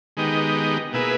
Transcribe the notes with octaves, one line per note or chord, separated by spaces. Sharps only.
D#3 G#3 B3 D#4 G4
B2 A#3 E4 G#4 B4